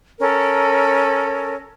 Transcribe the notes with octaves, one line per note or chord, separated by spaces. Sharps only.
C#4 A4 A#4